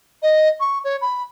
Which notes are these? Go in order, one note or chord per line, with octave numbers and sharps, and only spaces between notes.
D#5
C#6
C#5
B5